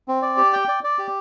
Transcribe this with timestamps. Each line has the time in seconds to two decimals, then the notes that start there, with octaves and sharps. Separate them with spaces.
0.08 C4
0.22 D5
0.37 G4
0.53 G5
0.68 D5
0.84 D5
0.99 G4